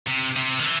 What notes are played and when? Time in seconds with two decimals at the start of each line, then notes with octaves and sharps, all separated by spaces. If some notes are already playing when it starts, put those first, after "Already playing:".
0.07 C3
0.36 C3
0.60 D#3
0.65 E3